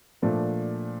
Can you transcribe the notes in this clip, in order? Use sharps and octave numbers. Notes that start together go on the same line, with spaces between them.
A#2 F3 A3 D4